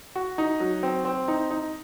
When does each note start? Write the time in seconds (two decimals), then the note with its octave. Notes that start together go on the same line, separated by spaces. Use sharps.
0.15 F#4
0.38 D#4
0.60 F#3
0.83 C4
1.05 C4
1.28 D#4
1.51 D#4